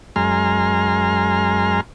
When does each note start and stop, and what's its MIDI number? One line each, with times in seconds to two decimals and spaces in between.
0.16 1.81 42
0.16 1.81 56
0.16 1.81 80
0.16 1.81 82
0.16 1.81 84
0.16 1.81 89